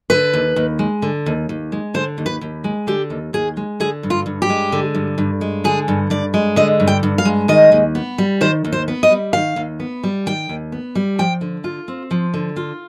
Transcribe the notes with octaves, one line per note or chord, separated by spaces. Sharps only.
D3 B4
D#2
D#2
G#3
D3
D#2
D#2
G#3
D3 C5
D#2
B4
D#2
G#3
D3 G4
D#2
D#2 G#4
G#3
D3 G#4
G2
F4
G2
G4
G#3
D3
G2
G2
G#3
D3 G#4
G2
G2 D5
G#3
D3 D#5
G2
G5
G2
F5
G#3
D#3 D#5
D#2
B3
G3
D#3 C5
D#2
C5
B3
D#5
G3
D#3 F5
D#2
B3
G3
D#3 G5
D#2
B3
G3
F3 G5
D3
F4
C4
F3
D3
F4